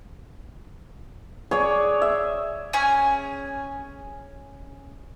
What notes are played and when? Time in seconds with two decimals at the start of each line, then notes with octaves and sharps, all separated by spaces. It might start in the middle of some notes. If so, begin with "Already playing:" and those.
1.51 G#4 C#5 D5 F#5
2.02 E5
2.73 C#4 G#4 G#5